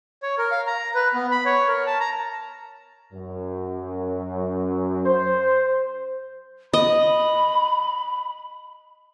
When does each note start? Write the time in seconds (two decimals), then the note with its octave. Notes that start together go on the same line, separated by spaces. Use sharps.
0.23 C#5
0.38 A#4
0.52 F5
0.67 A#5
0.95 B4
1.14 B3
1.31 B5
1.45 C#5
1.68 A#4
1.86 A5
2.00 A#5
3.13 F#2
5.06 C5
6.73 D#5 B5